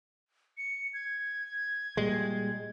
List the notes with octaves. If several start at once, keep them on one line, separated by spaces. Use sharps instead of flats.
C#7
G#6
A#2 G3 G#3